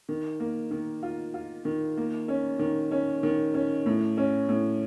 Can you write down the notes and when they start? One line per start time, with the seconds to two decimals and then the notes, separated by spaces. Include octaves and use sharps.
0.09 D#3
0.40 A#3
0.71 D#3
1.03 F4
1.34 F4
1.65 D#3
1.97 A#3
2.28 C#4
2.59 D#3
2.91 C#4
3.23 D#3
3.54 C#4
3.86 A2
4.17 C#4
4.49 A2